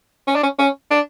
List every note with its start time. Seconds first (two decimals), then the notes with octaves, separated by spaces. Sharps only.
0.28 C#4
0.36 D4
0.43 C#4
0.59 C#4
0.91 D4